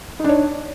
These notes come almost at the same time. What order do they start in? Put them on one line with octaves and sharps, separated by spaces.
D#4 D4 C#5